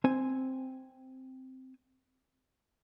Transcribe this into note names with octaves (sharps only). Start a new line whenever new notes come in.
C4 C5 G#5